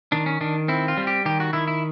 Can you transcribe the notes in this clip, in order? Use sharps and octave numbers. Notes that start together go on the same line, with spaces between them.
D#3 D4
C#4
D#3 D4
C4 E4
F4
G3
G4
D#3 G4
F#4
D#3 E4
E4